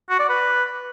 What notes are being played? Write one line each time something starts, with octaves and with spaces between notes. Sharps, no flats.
F#4
D5
B4